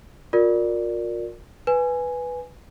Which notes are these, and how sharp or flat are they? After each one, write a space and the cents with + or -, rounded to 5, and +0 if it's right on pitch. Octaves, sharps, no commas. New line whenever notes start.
F4 +40 A#4 +0 D5 +0
B4 +0 G#5 +0